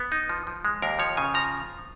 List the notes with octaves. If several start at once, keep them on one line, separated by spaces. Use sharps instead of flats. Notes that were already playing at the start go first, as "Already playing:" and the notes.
Already playing: B3
D#4
F3
F3
G#3
D#2 A#4
F3 C#5
C#3 G#5
F3 A#5